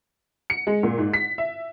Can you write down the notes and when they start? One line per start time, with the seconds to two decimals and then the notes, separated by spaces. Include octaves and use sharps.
0.50 C#7
0.67 G#3
0.83 A#2
0.98 G#2
1.14 B6
1.38 E5